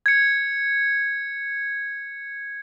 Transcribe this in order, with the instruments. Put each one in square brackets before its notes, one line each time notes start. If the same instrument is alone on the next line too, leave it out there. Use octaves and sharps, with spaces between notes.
[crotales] G#6 C#7